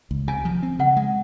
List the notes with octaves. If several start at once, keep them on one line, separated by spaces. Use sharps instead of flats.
C#2
C3 G#5
F3
C4
C#3 F#5
G#3